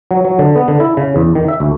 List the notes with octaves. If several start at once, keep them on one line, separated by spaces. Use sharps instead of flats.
F#3
F#3
D3
B3
D3
E4
C#3
E2
D#3
E5
D2